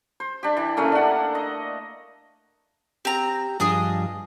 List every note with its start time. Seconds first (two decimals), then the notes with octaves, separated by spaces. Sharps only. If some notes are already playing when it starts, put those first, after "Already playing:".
0.20 C5
0.43 D4 G4
0.57 E3
0.77 C#3 A3 A#3 C#4
0.92 D4 F#5
1.35 D#5
3.05 C4 G4 A#5
3.60 G2 F3 D4 G#4 D#5